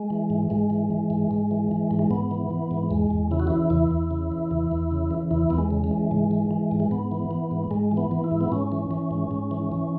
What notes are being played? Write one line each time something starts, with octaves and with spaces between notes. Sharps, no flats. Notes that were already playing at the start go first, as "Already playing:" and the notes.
Already playing: G#3
E3
G#2
G#2 G#3
E3
E3
G#2
G#2
E3
E3
G#2
G#3
G#2 B3
E3
E3
G#2
E2 G#3
E2
C#3 E4
F#4
E3 E4
E2 E4
E2
C#3
E3
E2
E2
C#3
E3
E2 E4
E2 B3
G#3
C#3
G#3
E3
G#2 G#3
E3
E3
G#2
G#3
G#2 B3
E3
E3
G#2
G#2 G#3
E3
B3
E3
E4
G#2
B3
G#2 C#4
E3
E3
G#2
G#2
E3
E3